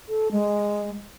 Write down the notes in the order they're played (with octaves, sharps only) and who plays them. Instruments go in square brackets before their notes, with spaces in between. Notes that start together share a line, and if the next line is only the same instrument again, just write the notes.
[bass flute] A4
G#3